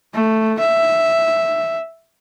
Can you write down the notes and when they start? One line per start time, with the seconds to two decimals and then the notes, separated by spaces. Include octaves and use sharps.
0.14 A3
0.59 E5